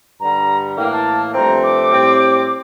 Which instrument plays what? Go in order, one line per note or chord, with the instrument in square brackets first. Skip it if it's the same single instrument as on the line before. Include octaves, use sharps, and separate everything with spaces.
[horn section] G2 D3 G3 [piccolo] A#5
[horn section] A2 E3 A#3 [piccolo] G5
[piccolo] A5
[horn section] G2 F3 A3 C4 [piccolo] A#5
[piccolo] D6
[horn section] A2 G3 C4